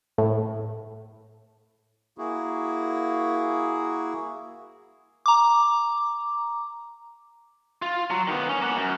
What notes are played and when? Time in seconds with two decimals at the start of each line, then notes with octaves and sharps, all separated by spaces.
0.18 A2
2.18 A#3 E4 F#4 G#4
5.26 A#5 D6
7.82 F4
8.11 F#3
8.28 D#3 B3
8.49 C#4
8.62 A#3 F#5
8.77 F#2